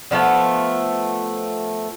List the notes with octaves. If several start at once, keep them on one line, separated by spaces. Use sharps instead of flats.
D3 F3 A3 B3